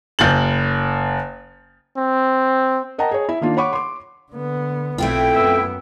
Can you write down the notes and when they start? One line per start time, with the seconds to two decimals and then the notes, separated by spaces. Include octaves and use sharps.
0.19 F#1 G6 A6 F#7
1.97 C4
2.98 A#4 D#5 F#5 G5 A5 A#5
3.11 G#4 C#5
3.29 E4 E5
3.41 D#3 A#3 D4 F4
3.57 C#5 F#5 B5 C#6 D6
3.73 C6 D6
4.32 D3 B3
4.98 B1 A3 C4 E4 F4 G5
5.35 F#2 B3 E5